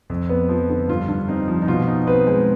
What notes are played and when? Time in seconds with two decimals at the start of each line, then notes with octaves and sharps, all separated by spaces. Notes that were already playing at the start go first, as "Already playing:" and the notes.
0.10 F2
0.29 B3
0.49 F3
0.70 D3
0.88 G2 F4
1.08 G2
1.28 C4 D#4
1.48 F3
1.62 D#4
1.67 B2 F4
1.87 D#4
2.07 C4 B4
2.27 G#3